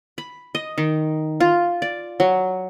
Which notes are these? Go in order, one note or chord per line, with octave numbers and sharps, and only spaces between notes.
B5
D#5
D#3
F4
D5
F#3